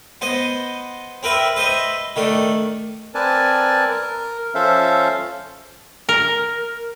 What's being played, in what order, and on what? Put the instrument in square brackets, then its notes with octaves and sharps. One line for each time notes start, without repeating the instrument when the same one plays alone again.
[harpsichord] B3 C5 D#5
C4 A#4 B4 E5
B4 C5 D#5 E5
D#3 A3 D4
[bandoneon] C4 A#4 B4 D5 G#5 A5
A#4
F3 C#4 A4 C5 E5 F5
[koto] A#4